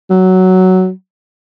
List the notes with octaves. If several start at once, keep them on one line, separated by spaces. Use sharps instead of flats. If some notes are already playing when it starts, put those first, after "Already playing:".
F#3